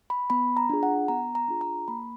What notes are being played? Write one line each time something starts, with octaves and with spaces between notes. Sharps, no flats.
B5
B3 B5
A#5
D4 F4 G#4
F#5
B3 A#5
A#5
D4 F4 G#4
A#5
A#3 B5